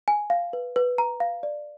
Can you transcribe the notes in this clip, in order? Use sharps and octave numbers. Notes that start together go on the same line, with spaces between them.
G#5
F5
B4
B4
A#5
F5
D5